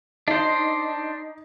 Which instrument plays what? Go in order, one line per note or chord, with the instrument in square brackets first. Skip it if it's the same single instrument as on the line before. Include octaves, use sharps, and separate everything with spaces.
[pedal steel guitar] D4 C5 [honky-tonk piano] D#4